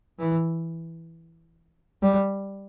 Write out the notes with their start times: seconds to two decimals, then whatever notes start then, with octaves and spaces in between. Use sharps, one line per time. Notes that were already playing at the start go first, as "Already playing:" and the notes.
0.19 E3
2.02 G3